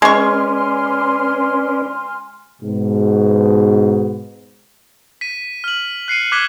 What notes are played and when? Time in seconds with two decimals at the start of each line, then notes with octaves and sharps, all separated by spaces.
0.02 G#3 C#4 B4 D5 G#5 C6 C#6 F6
2.62 G#2 B2
5.21 B6 D#7
5.64 F6 F#7
6.08 F#6 C7 C#7 D#7
6.32 D6 F#6 G#6 B6 G7